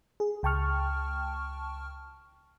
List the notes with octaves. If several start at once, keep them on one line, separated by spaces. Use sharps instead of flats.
G#4
C#2 G5 A5 C#6 F6